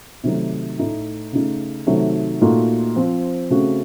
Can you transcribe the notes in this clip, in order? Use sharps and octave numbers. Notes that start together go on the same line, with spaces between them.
C3 D#3 F#3 A3 D#4
A2 A3 D#4
C#3 A3 D#4
C3 D#3 F#3 A3
A#2 A3 D#4 F#4 A4
F3 C4 F4
C#3 A3 C4 F#4